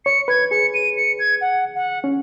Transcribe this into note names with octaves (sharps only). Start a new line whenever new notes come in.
C#5 C#7
B4 G#6
G#4 C#7
D#7
C#7
G#6
F#5
F#5
C#4